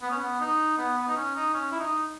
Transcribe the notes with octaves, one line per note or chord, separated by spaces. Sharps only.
B3
C#4
B3
D#4
B3
B3
D#4
C#4
D#4
C#4
E4
D#4